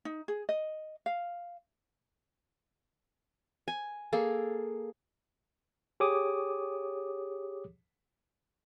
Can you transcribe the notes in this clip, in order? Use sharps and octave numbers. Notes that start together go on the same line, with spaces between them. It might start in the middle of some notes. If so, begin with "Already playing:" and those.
D#4
G#4
D#5
F5
G#5
A#3 G#4 A4
G4 G#4 C#5 D6 D#6